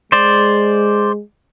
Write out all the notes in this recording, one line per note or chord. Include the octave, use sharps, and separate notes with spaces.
G#3 C5 D5